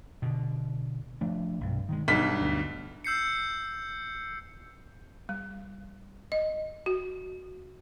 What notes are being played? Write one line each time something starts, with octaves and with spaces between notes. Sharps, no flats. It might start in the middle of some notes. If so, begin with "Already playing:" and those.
B2 D3
F3 A3 D4
B1 G2 C3
D#3 F3 G#3
B1 G2 D4 B6
D2
E6 G6 C7 C#7
G3
D#5
F#4